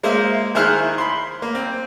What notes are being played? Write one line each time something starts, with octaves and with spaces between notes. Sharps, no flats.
G#3 A#3 C5 E5 F5
D#3 E4 G#4 C5 F6 F#6
B5 C6
A#3
C4